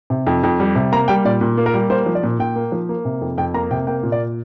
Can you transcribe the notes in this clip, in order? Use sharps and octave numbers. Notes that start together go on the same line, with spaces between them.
C3
F2
F2
G3
C3
A#3 A#5
G3 G5
A#2 D5
A#2
A#3
A#4
G3
A#3 C5
F3
D5
A#2
A#2 G5
A#3
F3
A#3
C3
F2
F2 G5
A#3 A#5
C3 G5
A#3 G5
A#2
D5